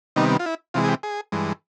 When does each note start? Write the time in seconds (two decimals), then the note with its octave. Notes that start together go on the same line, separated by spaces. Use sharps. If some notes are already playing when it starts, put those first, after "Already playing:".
0.16 C3 D#3 G3 B3 D#4
0.39 F4
0.46 E4
0.74 C3 E3 G#3 F4
0.84 G#4
0.89 G4
1.03 G#4
1.32 G2 E3 G#3